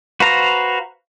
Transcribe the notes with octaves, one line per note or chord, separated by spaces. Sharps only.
F#4 B4 C5 F5 A#5